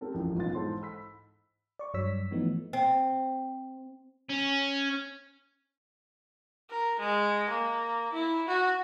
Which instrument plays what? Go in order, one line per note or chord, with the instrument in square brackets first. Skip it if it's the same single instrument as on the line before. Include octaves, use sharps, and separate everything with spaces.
[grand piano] C4 G4 A4 A#4
A1 F#2 F3
B1 B3 F4 A6
G#2 E3 A4 C5 C6
B5 E6 B6
[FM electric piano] D5 C#6
G2 F#3 C#5 E6 B6
E3 F3 A3 B3 D#4
[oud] C4
[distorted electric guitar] C#4
[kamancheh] A#4
G#3
A#3
E4
F#4